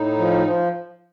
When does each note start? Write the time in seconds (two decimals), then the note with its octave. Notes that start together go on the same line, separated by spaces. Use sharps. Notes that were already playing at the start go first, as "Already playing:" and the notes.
Already playing: A2 D#4
0.18 F3
0.46 F3